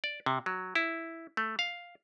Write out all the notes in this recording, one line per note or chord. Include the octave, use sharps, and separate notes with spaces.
D5
C3
F#3
E4
A3
F5